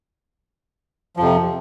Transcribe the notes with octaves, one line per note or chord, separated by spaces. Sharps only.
F2 C3 F3